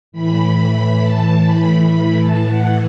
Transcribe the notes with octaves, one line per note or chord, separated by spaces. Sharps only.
A2 E3 B5
A5
B5
B5
A5
F#5